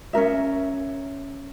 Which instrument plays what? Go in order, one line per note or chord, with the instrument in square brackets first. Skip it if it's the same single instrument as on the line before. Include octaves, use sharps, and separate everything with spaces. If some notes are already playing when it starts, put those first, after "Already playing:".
[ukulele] C#4 D4 A#4 E5